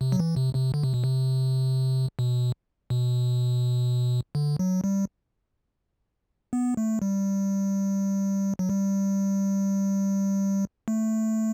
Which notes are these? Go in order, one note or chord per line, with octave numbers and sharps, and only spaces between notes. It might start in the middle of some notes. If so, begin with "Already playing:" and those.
C3
F#3
E3
C3
C3
D3
C3
B2
C3
B2
B2
D3
F#3
G3
B3
A3
G3
F#3
G3
A3